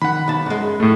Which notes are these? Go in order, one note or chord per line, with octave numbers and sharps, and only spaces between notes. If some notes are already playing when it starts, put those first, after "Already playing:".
D#3 F#5 B5
B1 A5
F#2 G#3
A2 A3